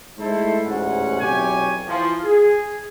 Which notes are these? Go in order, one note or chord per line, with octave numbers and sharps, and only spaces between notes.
G#3 A3 D#4 E4 A4 C5
A1 D2 G#2 C#4 F#5
B1 E2 C3 G4 C#5 G#5
E3 F3
G#4